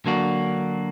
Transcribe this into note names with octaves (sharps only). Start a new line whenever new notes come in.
D3 F#3 A#3 D4 F#4